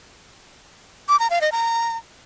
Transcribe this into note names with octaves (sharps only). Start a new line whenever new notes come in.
D6
A#5
F5
D#5
A#5